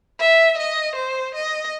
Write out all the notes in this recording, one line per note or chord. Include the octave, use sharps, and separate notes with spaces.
E5
D#5
C5
D#5